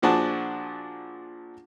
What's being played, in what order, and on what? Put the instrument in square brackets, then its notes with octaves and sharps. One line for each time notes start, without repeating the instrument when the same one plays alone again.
[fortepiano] A#2 F3 D4 F#4 G#4 A5